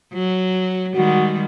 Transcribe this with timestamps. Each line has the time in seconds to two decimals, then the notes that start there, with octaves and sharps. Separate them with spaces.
0.13 F#3
0.96 D#3 G3 G#3 F#4